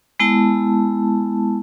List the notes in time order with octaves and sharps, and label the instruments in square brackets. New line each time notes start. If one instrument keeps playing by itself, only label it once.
[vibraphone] G#3 B3 E4 A5